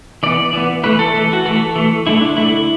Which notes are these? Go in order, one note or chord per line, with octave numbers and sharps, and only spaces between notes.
E3 B3 D5
E3 B3
E3 A3 B4
A4
E3 A3
F#4
E3 A3 A4
E3 A3
D3 A3 E4
D4
D3 A3 E4